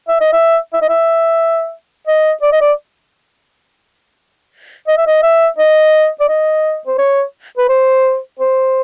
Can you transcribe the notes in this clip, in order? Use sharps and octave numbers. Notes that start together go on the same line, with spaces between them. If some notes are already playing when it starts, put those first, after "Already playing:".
E5
D#5
E5
E5
D#5
E5
D#5
D5
D#5
D5
D#5
E5
D#5
E5
D#5
D5
D#5
C5
C#5
B4
C5
C5